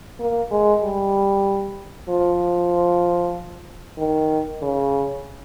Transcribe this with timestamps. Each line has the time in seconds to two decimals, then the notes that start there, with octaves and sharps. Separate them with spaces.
0.20 A#3
0.51 G#3
0.83 G3
2.09 F3
3.98 D#3
4.62 C#3